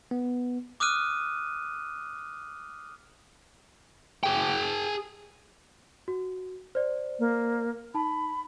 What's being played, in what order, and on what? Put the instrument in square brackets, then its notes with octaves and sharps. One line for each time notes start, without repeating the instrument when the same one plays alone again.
[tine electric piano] B3
[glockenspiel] D6 D#6 F6 F#6 D#7
[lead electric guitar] G#4 G5
[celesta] F#4
C5 D5
[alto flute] A#3
[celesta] D#4 A5 [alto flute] B5